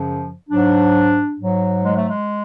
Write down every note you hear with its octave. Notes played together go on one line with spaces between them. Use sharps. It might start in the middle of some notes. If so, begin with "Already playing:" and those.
Already playing: F#2 C#3 F3
G#2 F#3 D4
G#2 F#3
G#3
A3
G#3